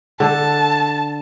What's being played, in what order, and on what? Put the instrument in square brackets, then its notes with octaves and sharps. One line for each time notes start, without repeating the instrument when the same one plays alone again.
[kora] D3 A4 [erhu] A5